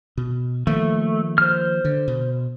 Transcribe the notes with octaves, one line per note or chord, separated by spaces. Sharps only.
B2
D#3 F3 A3 A#3
C5 F6
D3
B2